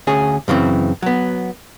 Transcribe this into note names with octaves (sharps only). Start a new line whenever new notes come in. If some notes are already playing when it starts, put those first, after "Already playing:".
D2 C#4 G#4
F#2 C#3 E3 C4
F#3 B3